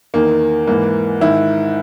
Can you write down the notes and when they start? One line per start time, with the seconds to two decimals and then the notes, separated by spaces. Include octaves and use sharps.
0.14 E2 D#3 A#3
0.67 G#2 E3 A#3
1.21 G#2 D#3 E4